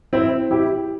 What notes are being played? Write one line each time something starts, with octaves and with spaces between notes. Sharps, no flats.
C4 E4
E4 G4